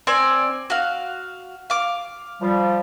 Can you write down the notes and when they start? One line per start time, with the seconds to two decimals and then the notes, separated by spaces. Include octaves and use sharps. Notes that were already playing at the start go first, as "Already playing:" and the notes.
0.07 C4 D5 G#5
0.70 F#4 F5
1.70 F5 D6
2.42 F3 G3